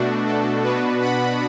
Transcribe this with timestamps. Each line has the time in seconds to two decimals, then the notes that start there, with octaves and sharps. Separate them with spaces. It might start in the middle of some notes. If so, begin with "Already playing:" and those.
Already playing: B2 A3 D4 F#4
0.25 A4
0.63 B2 B3 D4 F#4 B4
1.01 F#5 B5